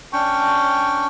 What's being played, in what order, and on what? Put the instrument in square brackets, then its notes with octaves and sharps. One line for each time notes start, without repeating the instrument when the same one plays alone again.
[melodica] C#4 D4 G5 C#6